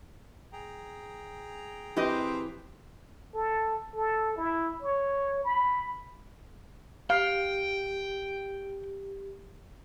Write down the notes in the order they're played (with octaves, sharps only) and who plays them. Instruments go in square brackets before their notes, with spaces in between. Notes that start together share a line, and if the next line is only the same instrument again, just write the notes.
[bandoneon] G#4 G5 A#5
[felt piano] E3 [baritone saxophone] C4 [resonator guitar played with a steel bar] G4 B4 D#5
[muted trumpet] A4
A4
E4
C#5
B5
[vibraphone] G4 [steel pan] F5 [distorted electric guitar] G5